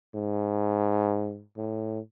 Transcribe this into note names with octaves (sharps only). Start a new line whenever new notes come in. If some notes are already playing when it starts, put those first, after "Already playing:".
G#2
A2